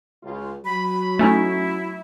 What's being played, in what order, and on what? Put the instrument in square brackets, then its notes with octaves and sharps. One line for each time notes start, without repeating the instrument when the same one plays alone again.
[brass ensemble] C#2 F4
[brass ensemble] F#3 [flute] B5
[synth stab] A3 C#4 D#4 [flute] E4